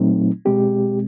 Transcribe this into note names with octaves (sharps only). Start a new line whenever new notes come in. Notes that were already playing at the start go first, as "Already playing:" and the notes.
Already playing: A#2 F#3 A3 C4 D#4
B2 G#3 C4 G4